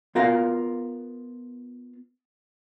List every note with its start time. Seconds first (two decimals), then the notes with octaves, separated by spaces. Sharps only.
0.15 B3 F4 A#4 F5